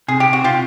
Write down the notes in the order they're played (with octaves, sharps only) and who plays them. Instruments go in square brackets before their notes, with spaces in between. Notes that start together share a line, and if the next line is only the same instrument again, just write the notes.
[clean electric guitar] C3 [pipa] G#4
[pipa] G4
F#4
[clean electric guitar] C3 [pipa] F4 G4